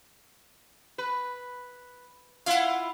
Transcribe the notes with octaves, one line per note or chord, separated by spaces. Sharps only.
B4
E4 F4 F5 F#5